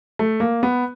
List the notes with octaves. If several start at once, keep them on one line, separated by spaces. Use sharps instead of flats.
A3
A#3
B3